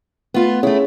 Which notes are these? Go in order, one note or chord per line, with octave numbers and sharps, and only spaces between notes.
A3 B3 F4
A3 C#4 E4 G#4 C#5